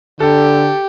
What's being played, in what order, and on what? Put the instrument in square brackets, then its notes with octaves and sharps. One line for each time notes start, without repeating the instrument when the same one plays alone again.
[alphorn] D3 [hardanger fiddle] G4 [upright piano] A4